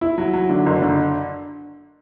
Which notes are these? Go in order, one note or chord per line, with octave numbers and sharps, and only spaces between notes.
E4
F#3
F#3
D3
F#1
D3